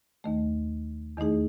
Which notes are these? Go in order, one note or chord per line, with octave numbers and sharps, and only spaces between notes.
D#2 D#3 A3
E2 D#3 A3 D#4 G#4